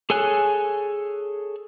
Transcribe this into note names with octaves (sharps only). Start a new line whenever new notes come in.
G#4 A4 C#5 G#5 F#6